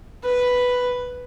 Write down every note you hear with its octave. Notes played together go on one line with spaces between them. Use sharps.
B4